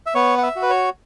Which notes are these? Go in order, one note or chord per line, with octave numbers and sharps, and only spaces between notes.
E5
B3 C#5
F#5
E5
F#4
B4
C#5